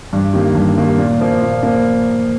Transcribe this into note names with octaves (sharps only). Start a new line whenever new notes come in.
G2
D#3 G3 A#3
G2
D#3 G3 A#3
A#2
F3 A#3
A#2
F3 A#3